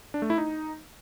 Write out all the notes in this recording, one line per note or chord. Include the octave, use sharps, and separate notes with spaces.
D4
A3
E4
D#4